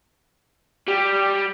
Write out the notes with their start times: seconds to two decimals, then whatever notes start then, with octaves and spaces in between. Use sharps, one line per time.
0.88 G3